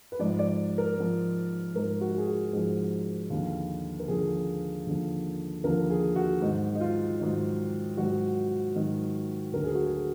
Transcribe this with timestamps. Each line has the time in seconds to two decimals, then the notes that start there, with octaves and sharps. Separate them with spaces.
0.12 B4
0.19 G#2 F3 D5
0.39 D5
0.78 A#4
0.97 G#2 F3
1.75 G#2 F3 A#4
2.01 F#4
2.18 G#4
2.27 F#4
2.53 G#2 F3 G#4
3.30 D#2 D3 F3
4.00 A#4
4.08 D#2 D3 F3 G#4
4.87 D#2 D3 F3
5.64 D#2 D3 F3 A#4
5.90 G#4
6.16 F#4
6.41 G#2 D#3 F#3 D#4
6.75 D#4
6.81 F4
7.20 G#2 D#3 F#3
7.97 G#2 D#3 F#3 F#4
8.75 G#2 D#3 F#3
9.53 D2 D3 F#3 A#4
9.64 G#4
9.75 F#4
9.87 G#4